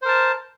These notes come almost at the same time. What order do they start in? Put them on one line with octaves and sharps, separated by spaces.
C5 A#4 A5